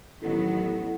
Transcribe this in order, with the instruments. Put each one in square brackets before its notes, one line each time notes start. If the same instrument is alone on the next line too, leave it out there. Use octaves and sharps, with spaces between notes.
[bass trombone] A1 [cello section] D#3 F#3 B3 [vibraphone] E4 F#5 [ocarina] A4